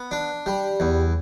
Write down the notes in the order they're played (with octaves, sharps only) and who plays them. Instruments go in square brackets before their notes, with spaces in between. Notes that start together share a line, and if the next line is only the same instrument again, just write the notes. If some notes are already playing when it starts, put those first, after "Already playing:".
Already playing: [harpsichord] B3
D4
G3
E2